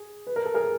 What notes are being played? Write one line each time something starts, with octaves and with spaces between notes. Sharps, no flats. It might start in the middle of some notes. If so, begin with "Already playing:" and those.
Already playing: G#4
B4
A#4
A4
G#4 A#4